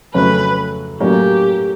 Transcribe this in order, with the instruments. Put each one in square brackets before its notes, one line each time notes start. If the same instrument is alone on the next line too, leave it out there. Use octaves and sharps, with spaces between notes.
[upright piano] F2 C#3 F#3 A3 C#4 [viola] B4
[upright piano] A2 F#3 A#3 C#4 [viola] G4